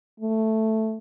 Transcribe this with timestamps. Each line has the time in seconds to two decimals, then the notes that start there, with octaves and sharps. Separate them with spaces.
0.20 A3